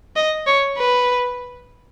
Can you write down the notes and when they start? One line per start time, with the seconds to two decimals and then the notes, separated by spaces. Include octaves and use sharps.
0.16 D#5
0.47 C#5
0.78 B4